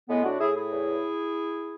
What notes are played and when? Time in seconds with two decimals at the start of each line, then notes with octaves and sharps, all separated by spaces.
0.09 A2 G#3 B3
0.24 D4 F#4
0.40 A2 E4 G#4
0.54 E4 G#4
0.71 E2